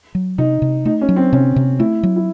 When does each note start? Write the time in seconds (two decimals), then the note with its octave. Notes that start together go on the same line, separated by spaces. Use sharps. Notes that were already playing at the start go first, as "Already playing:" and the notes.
0.15 F#3
0.38 C3 D#4
0.62 C3
0.85 A3 D#4
1.01 C#4
1.09 F#3
1.16 C4
1.33 C3 C#4
1.56 C3
1.79 A3 E4
2.03 F#3
2.16 E4